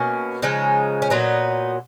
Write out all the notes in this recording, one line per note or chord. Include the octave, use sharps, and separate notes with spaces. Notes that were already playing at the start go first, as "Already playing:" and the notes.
Already playing: B2 A#3 C#4
C#3 F3 G#3 D#4
C#4
A#2 F#3 B3 D#4